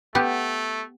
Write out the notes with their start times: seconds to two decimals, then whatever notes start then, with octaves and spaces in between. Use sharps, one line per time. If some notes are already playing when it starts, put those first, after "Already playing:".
0.15 A3 B3 G4